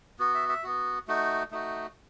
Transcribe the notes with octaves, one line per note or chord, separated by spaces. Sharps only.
B3 F#4
E5
E5
B3 F#4
A3 D#4 F#4
A3 D#4 F#4